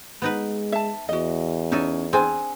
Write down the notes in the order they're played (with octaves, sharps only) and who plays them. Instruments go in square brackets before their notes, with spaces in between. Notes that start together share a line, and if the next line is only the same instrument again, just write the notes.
[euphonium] G#3 [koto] B3 D#4 B4
[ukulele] E5 A5
[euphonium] E2 [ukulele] F#4 D#5
[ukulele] C#4 [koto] D#4 A4 G#5
[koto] C4 D4 [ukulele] G#4 G#5